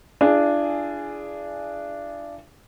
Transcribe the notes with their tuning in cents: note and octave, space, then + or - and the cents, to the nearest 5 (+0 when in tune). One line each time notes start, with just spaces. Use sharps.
D4 +0 F4 -45 G#4 +0